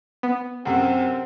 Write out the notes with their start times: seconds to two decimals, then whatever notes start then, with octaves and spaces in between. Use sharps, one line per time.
0.23 B3
0.65 F#2 C3 C4 G4 A4 F#5